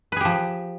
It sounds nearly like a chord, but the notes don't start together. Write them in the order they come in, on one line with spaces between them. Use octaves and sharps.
B4 G#4 G4 F3